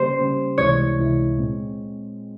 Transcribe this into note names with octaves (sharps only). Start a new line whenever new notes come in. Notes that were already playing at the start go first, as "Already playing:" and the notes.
Already playing: C#3 G3 A#3 C#4 G4 C5
C#3 G3 A#3 C#4 G4
C#2 C3 E3 G#3 E4 C#5
C#2 C3 E3 G#3 E4
A#2 G#3 C4